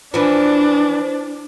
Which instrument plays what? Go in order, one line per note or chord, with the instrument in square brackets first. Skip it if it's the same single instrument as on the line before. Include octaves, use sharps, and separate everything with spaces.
[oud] E3 F3 [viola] D4